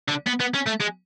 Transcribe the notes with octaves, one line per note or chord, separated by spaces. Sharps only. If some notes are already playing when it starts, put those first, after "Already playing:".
D3
B3
B3
C#4
A3
G#3